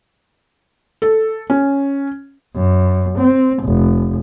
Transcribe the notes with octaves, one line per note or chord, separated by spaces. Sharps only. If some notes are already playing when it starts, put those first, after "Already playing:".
A4
C#4
F#2
C4
F1